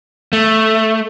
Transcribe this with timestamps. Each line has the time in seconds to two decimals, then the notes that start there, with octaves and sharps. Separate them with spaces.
0.33 A3